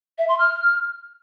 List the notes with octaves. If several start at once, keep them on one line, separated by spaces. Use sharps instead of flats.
E5
C6
F6